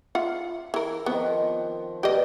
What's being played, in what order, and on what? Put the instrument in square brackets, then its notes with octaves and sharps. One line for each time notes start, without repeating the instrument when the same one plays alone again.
[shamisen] F4 E5 F#5
E3 A#4
[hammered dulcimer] D#3 F3 C4 [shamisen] B3
[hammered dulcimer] B2 D5 [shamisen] G4 D#5